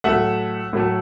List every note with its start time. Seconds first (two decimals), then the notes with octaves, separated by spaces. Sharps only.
0.04 A2 F#3 A3 E5 F#5
0.73 A2 F#3 A3